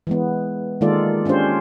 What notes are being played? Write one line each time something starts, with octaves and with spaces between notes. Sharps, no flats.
E3 G#3 B3
D#3 G#3 A#3 F4 A4 D5
C#4 D4 F4 G4 C5